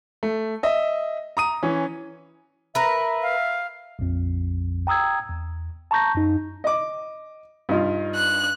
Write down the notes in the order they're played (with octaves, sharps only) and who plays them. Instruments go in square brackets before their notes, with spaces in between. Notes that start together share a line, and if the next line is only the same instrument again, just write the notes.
[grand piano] A3
D#5 E5
A#5 D#6 D#7
E3 C#4
[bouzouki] A#4 B4 [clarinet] E5
[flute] F5
[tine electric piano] A#1 F2
G5 A#5 D#6 E6 G#6
E2
A5 A#5 C#6 G6 A#6
F#2 D#4
[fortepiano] D#5 D6
G2 D#4 F4
[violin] F#6